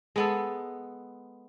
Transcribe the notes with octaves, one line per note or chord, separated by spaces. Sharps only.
G#3 B3 A4